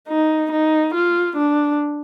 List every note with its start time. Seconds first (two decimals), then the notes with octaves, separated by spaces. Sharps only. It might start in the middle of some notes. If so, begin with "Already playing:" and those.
0.08 D#4
0.51 D#4
0.94 F4
1.36 D4